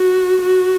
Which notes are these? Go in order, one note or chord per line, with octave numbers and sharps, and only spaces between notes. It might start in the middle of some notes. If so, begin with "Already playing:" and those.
Already playing: F#4
F#4